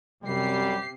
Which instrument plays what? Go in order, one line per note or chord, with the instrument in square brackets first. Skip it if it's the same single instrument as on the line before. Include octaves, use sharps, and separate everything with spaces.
[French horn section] F#2 G3 [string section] C3 C7 [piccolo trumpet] G4